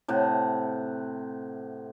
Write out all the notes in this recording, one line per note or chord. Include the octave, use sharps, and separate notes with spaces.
A2 C3 F#5